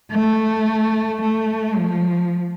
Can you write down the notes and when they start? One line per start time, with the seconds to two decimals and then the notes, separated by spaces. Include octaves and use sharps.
0.12 A3
1.22 A3
1.77 F3